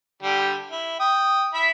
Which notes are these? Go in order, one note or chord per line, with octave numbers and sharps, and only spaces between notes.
D3 G3 G4
E4
G5 D#6
E4 E5 B5